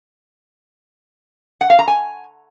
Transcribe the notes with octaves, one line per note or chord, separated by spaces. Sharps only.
F#5
F5
A#5
G#5